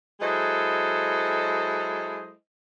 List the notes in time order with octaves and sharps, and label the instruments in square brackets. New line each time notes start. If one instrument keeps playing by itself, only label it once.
[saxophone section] F#3 G#3 E4 A4 C5 D#5